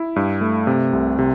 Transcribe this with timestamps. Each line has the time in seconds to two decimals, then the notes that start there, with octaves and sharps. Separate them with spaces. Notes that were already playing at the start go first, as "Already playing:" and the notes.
Already playing: E4
0.16 G2
0.41 A3
0.67 C3
0.93 C2
1.19 C3